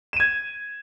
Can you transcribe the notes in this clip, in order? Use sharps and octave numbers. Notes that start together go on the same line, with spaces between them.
G#6 D#7 E7